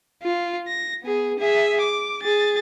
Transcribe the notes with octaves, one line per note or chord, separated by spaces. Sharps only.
F4
A#6
B3 G#4
G#4 E5
D6
G#4 A6